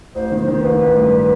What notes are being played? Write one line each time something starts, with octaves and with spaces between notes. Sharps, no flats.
A1 C5
D#3
C5
D#3
A1 B4
A1
G2